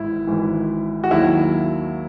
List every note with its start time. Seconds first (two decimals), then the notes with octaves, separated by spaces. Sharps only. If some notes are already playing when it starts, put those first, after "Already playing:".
Already playing: G#1 G#2 E3 E4
0.27 G#1 G#2 E3
1.04 F#4
1.11 D#2 D#3 F#3 E4